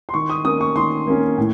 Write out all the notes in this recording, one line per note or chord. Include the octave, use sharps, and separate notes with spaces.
C6
D#3 C#6
D#6
A#3 C#4 D#6
C#6
D#3 C6
A#3 C#4
A2